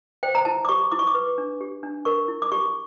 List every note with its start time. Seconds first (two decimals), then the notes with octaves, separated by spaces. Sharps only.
0.23 C5 G5
0.35 A#5
0.45 E4 A5
0.65 D6
0.69 G4 C#6
0.92 E4 D6
0.99 C#6
1.07 D6
1.14 B4
1.38 D4
1.61 G4
1.83 D4
2.05 A#4 C#6
2.28 E4
2.42 D6
2.52 G4 C#6